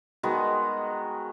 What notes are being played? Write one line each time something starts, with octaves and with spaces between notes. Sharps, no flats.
D#3 G#3 B3 F#4